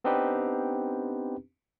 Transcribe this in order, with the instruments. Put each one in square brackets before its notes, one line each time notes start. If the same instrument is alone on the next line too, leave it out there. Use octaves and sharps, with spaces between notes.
[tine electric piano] B3 C4 D4 D#4 G4 B4